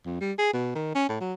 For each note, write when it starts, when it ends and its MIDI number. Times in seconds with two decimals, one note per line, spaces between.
0.06 0.19 41
0.21 0.32 55
0.39 0.52 68
0.53 0.73 47
0.75 0.91 51
0.94 1.08 61
1.09 1.17 45
1.20 1.33 54